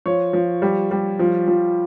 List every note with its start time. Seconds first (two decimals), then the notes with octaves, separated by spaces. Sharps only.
0.06 F3 C#5
0.33 F3
0.62 G3
0.91 G3
1.19 F3
1.48 F3